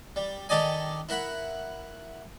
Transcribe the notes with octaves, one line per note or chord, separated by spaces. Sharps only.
G3
D#3 G4 A4 D5 D#5 G#5
E4 A#4 F#5 B5